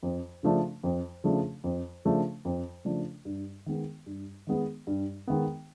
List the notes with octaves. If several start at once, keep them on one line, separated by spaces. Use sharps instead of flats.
F2
C#3 F3 A3 D4
F2
C#3 F3 A3 D4
F2
C#3 F3 A3 D4
F2
C#3 F3 A3 D4
G2
D#3 G#3 B3
G2
D#3 G#3 B3
G2
D#3 G#3 B3